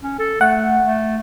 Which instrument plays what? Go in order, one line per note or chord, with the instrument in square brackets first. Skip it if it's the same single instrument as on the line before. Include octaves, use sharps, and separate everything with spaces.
[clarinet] C#4
A4
[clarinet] A3 [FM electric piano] F#5
[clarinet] A3